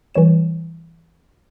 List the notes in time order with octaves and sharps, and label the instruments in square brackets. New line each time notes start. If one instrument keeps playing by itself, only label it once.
[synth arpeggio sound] E3 G3 C#5 E7